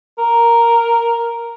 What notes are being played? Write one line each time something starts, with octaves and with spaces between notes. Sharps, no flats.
A#4